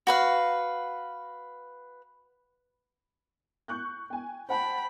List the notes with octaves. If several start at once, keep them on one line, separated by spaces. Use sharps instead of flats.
F#4 B4 F5
C#6 F#6 G6
G5 G#5
C5 F#5 G5 A5 B5